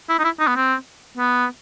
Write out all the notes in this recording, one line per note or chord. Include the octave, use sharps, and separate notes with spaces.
E4
D#4
E4
D#4
B3
C4
B3